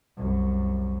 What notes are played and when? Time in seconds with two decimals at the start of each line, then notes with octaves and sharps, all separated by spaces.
0.17 C2 F#2